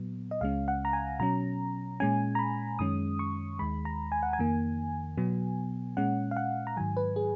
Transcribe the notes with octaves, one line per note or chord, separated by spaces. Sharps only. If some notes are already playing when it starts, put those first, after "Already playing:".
Already playing: A#2 F#3 B3
D#5
C#2 C#3 G#3 C#4 F5
F#5
A#5
G#5
B2 F#3 C#4 A#5
A#2 G#3 C#4 G#5
A#5
B5
F#2 D#3 G#3 C#4 D#6
C#6
D#2 D#3 G#3 B5
A#5
G#5
F#5
G#5
F2 D#3 A#3
B2 F#3 B3
A#2 G#3 C#4 F#5
F5
F#5
A#5
G#2 D#3 F#3 G#5
B4
G#4